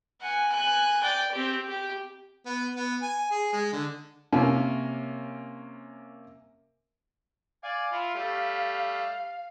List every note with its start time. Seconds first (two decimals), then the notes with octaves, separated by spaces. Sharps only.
0.21 F#5 G#5
0.52 G#5 F#6
1.02 D5 G5
1.32 C4 G4
1.68 G4
2.46 B3
2.76 B3
3.02 G#5
3.31 G#4
3.53 G#3
3.73 D3
4.33 C3 A#3 C#4
7.64 D5 F5 G#5
7.92 E4 F4
8.14 G3 A3